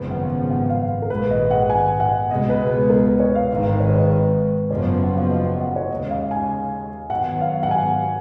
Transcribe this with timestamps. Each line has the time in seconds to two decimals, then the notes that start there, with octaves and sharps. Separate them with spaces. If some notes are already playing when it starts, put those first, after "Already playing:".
Already playing: G#1 F#2 C#3 F3 B3 B4
0.11 F#5
0.50 F#5
0.69 F5
1.02 A#4
1.10 A#1 G#2 D#3 G#3 B4
1.30 D#5
1.51 F#5
1.70 G#5
2.00 F#5
2.31 C#2 B2 G#3 B3 D#5
2.50 B4
2.70 B4
2.90 A#4
3.05 B4
3.20 C#5
3.35 F5
3.50 G#1 G#2 D#3 G#3 F5
3.66 B4
3.80 C#5
3.89 B4
3.95 C#5
4.10 B4
4.70 F#1 F#2 F3 B3 C#5
5.03 F#5
5.16 F5
5.30 D#5
5.46 F#5
5.61 F#5
5.76 C#5
5.90 D#2 C#3 G#3 D#5
6.10 F5
6.31 G#5
7.10 G#2 D#3 F#3 B3 F#5
7.41 F5
7.63 F#5
7.71 G#5